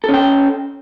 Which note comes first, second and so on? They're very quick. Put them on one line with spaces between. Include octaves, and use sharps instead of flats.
A4 C#4 G5